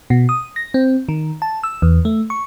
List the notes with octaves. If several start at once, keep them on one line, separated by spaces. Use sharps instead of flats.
B2
D#6
A#6
C4
D#3
A5
E6
E2
A3
C#6